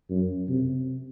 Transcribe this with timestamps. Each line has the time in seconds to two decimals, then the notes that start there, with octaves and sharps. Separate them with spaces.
0.10 F#2
0.49 C3